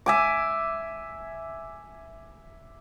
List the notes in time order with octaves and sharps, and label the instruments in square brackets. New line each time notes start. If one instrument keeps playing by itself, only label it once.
[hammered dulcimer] E5 G#5 D6